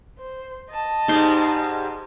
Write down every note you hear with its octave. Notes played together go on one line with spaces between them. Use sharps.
C5
D#5 A5
G#2 G3 G#3 D#4 C6